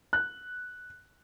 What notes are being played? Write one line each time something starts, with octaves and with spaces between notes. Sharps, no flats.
F#6